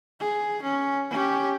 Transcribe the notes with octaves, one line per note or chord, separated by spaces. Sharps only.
G#4
C#4
C#4 G4